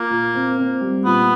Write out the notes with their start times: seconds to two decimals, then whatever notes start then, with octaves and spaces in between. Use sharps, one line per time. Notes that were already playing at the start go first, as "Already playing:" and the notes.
Already playing: A#3 F4
0.10 A#2
0.35 C4
0.58 C4
0.81 G3
1.05 A#2 B3